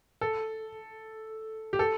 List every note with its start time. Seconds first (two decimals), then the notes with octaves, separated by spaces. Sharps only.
0.21 A4
1.73 G4
1.79 A4